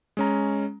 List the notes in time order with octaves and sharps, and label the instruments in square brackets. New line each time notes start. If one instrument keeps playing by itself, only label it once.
[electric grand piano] G#3 C#4 A#5